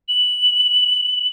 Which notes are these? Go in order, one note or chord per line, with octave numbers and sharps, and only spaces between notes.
F#7